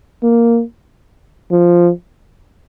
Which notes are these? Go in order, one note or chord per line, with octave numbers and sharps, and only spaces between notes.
A#3
F3